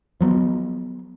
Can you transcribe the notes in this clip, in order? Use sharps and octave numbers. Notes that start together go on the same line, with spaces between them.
F3 F#3 B3